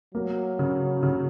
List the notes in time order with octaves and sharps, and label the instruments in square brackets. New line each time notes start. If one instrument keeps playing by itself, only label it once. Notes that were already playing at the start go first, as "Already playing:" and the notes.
[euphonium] F#3 [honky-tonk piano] A#3
[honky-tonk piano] C#3
C#3